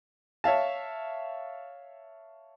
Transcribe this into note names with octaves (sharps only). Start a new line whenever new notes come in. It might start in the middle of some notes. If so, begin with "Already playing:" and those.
C#5 E5 F5 A5